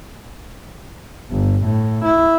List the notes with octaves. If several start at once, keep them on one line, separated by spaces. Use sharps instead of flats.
G1
A2
E4